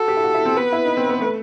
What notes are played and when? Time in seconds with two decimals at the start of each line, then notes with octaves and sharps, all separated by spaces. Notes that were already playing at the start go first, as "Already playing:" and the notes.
Already playing: F#4 A4
0.08 G4
0.17 E4
0.23 F#4
0.34 E4
0.45 C4
0.56 B3 B4
0.73 E4
0.85 D#4
0.97 C4
1.09 B3
1.21 A3